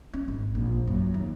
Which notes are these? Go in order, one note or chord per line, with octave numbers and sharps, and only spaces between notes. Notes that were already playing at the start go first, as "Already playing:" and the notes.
C#4
G#1
A#1
F#2
D#2